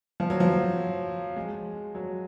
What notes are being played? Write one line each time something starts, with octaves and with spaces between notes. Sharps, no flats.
F3
F#3
F3
G#3
F#3